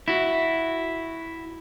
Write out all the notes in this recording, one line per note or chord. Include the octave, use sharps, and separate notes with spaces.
E4 F#4